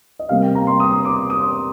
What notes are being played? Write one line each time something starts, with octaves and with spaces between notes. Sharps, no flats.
D#5
C3 G3 A#3 F5
G5
A#5
C6
D#6
D6
D#6